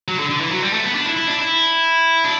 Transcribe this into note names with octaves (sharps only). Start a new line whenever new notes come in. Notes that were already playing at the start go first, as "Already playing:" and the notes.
F#3
D3
D3
E3
F#3
G3
A3
B3
D4
E4
E4
D4
E4
D4